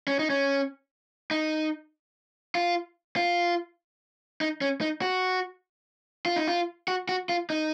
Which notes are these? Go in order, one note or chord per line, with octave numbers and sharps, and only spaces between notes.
C#4
D#4
C#4
D#4
F4
F4
D#4
C#4
D#4
F#4
F4
D#4
F4
F#4
F#4
F4
D#4